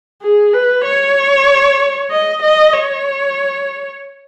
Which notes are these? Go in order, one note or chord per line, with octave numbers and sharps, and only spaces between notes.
G#4
B4
C#5
D#5
D#5
C#5